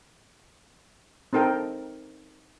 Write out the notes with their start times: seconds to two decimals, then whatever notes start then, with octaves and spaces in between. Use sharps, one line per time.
1.33 C4 D#4 A4 A#4 G5 A#5